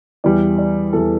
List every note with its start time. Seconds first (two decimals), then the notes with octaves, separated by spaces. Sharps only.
0.24 E2 E3 G3 D5
0.58 D5
0.93 E2 E3 G3 A4